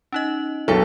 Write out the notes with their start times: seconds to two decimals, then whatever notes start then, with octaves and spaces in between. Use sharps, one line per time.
0.12 C#4 D#4 D#5
0.68 B1 B2 D4 G#4 A4 E5